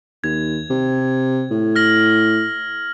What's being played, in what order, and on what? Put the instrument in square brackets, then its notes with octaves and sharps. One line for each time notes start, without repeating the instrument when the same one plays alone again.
[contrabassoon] D#2 [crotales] G#6
[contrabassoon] C3
A2
[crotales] F6 A#6 F#7